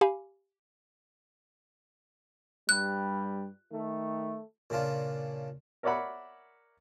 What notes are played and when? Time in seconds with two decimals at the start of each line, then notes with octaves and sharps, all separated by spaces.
0.01 G4 F5 G#5 B5 D6
2.69 G2 G3 F#6
3.71 D#3 A3
4.70 A#2 C#3 D4 F4
5.83 A#4 C#5 D5 E5 F#5 B5